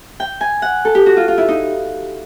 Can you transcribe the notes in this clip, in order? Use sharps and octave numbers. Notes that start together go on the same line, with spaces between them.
G5
G#5
F#5
A4
G4
F#4
F4
F4
E4
D#4